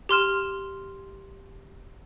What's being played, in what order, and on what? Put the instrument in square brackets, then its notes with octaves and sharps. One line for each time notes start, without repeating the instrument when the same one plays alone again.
[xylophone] G4 C6 F6 E7